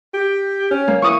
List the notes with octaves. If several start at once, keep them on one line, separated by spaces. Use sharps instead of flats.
G4
C#4
A#3
E3 C#6 D#6